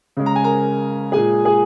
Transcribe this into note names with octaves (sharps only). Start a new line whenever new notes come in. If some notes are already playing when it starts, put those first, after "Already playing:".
C#3 G#3
A#5
G#5
A#4 A#5
A#2 G#3 G#4 G#5
G#4 G#5